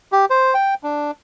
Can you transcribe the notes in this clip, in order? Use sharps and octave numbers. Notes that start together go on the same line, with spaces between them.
G4
C5
G5
D4